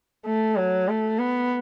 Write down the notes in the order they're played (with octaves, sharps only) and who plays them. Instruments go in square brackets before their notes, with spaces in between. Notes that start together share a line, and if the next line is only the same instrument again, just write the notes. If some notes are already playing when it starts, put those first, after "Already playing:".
[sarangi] A3
F#3
A3
B3